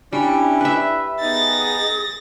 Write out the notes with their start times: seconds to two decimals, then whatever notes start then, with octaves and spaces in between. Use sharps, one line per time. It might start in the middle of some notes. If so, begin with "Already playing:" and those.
0.13 G3 C#4 D4 E4
0.61 B4 E5
1.21 B3 D#4 G#4 A6 A#6